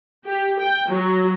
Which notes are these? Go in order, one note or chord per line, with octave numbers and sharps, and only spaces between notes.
G4
G5
F#3